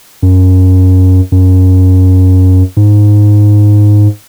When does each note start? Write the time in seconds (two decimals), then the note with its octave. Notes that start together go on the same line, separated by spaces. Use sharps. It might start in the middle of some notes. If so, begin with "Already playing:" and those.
0.23 F#2
1.32 F#2
2.77 G#2